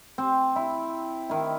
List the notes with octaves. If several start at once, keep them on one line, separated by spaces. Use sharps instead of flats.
C4
E4
D#3 E4